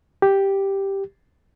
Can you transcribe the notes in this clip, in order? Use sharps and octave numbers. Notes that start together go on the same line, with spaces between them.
G4